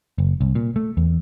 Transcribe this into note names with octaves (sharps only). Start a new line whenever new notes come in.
F#1
C2
A#2
A3
E2